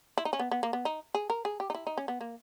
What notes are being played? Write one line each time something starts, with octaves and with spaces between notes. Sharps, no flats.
E4
D#4
C#4
B3
B3
A#3
B3
D#4
G#4
A#4
G#4
G4
D#4
E4
D#4
C#4
B3
A#3